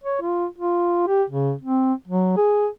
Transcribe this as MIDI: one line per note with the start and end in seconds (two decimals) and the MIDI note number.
0.04 0.19 73
0.21 0.46 65
0.58 1.04 65
1.07 1.23 67
1.30 1.53 49
1.61 1.93 60
2.08 2.32 54
2.37 2.68 68